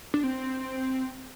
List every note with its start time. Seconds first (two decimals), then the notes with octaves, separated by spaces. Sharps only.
0.14 D4
0.23 C4